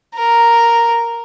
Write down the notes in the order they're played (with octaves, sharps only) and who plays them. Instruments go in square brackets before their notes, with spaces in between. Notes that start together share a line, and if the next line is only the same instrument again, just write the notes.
[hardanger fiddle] A#4